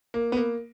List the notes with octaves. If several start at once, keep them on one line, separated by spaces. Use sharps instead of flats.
A#3
B3
A#3